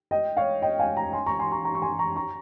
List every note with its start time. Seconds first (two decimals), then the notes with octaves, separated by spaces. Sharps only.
0.11 D#5 G5
0.37 C#5 F5
0.62 D#5 G5
0.79 F5 G#5
0.97 G5 A#5
1.13 G#5 C6
1.26 A#5 C#6
1.39 G#5 C6
1.52 A#5 C#6
1.65 A#5 C#6
1.75 C#6
1.82 G#5 C6
1.99 A#5 C#6
2.16 A#5 C#6